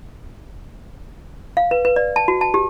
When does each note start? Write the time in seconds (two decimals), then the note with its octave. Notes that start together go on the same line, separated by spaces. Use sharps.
1.57 F5
1.71 B4
1.85 B4
1.96 D5
2.16 A5
2.28 F#4
2.41 A5
2.54 G4